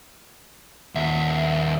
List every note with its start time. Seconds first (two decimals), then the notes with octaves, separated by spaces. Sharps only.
0.95 D#2 E5